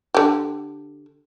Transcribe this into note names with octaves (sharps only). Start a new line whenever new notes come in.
D3 G4